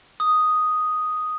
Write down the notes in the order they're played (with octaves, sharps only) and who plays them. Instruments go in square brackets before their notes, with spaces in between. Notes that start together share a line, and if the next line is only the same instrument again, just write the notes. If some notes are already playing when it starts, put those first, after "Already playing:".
[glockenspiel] D#6